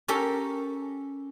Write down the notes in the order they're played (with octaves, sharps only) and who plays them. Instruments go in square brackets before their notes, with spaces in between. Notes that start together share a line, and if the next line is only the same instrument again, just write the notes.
[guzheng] C#4 G4 A4 A#4